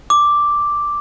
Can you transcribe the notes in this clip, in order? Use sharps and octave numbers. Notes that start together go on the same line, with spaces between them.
D6